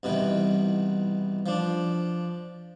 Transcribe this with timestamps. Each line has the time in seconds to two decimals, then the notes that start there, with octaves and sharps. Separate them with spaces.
0.03 C2 B2 D#3 E3
1.46 F3 D4